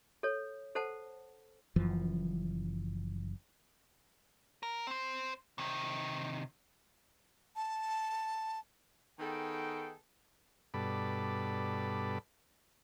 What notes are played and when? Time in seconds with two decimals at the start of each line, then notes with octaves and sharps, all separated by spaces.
0.23 A4 C#5
0.75 A4 C5 F#5 A5
1.76 F#1 F#2 E3 F3
4.63 A#4
4.87 C4 C5
5.58 C3 D#3
7.56 A5
9.20 D#3 B3 G#4 A4 G5
10.74 G2 B2 A4 D5 B5